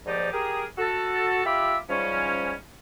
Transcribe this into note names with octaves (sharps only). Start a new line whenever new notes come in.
D#2 G#2 F3 D#4 G4 D5
G4 G#4 A#4
F#4 A4
F4 G4 E5 B5 D6 E6
G#2 F3 G3 C#4